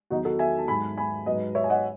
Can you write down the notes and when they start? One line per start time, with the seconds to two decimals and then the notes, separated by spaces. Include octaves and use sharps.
0.10 E2 D#3 F#3 D#4 F#4
0.25 F#4 A4
0.39 E5 G#5
0.59 A5
0.68 G#2 F#3 G#5 B5
0.97 G#5 B5
1.26 F#3 B4 D#5
1.31 G#2
1.55 C#5 E5
1.64 G#5
1.69 D#5 F#5